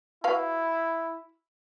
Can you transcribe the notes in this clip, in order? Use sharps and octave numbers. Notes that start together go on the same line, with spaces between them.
E4 F#4 B4 F5